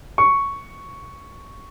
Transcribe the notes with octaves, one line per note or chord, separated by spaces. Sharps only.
C#6